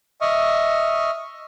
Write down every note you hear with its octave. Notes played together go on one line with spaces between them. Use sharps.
D#5 E5 C#6 D#6 F6